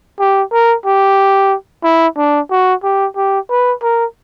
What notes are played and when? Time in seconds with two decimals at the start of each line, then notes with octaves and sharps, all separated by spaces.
0.19 G4
0.52 A#4
0.86 G4
1.84 E4
2.17 D4
2.51 F#4
2.83 G4
3.16 G4
3.50 B4
3.82 A#4